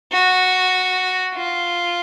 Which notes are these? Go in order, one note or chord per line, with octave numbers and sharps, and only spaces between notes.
F#4
F4